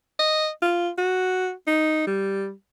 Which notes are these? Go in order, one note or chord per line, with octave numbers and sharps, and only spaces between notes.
D#5
F4
F#4
D#4
G3